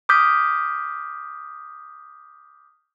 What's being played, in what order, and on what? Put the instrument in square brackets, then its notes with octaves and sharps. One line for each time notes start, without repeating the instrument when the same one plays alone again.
[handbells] D6 D#6 F6 G6 B6